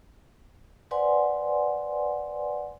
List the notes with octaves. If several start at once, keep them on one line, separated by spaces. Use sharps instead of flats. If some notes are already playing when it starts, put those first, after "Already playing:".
B4 C5 D5 F#5 G#5 C6